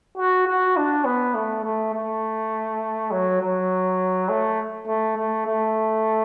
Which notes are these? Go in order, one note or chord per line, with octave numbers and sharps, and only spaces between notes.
F#4
F#4
D4
B3
A3
A3
A3
F#3
F#3
A3
A3
A3
A3